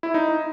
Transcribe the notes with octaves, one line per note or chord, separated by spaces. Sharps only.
E4
D#4